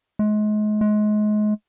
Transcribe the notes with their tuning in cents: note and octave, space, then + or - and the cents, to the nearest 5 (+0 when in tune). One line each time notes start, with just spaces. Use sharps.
G#3 +35
G#3 +30